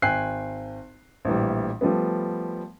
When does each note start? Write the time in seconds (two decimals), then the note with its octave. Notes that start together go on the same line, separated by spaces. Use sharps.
0.02 G#1 G5 G#5 F#6 C7
1.25 A#1 A2 E3 G3
1.81 F3 G3 A3 B3